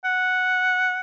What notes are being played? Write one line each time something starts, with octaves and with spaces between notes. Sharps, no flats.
F#5